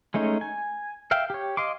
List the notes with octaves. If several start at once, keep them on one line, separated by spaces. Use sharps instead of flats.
G#3 A3 C#4 D#4 C#5
G#5
E5 F5 G5
G4 C#5
D#5 F5 C6 D6